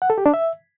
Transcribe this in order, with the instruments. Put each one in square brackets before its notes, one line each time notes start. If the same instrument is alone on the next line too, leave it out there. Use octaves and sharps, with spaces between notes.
[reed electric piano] F#5
A4
G4
D4
E5